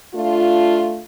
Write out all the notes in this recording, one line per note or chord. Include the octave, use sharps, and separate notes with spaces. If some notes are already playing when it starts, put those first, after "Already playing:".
A3 D4 F4